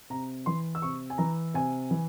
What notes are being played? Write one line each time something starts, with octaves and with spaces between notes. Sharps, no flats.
C3 A#5
E3 C6
E6
C3 C#6
G#5
E3 A#5
C3 G#5
E3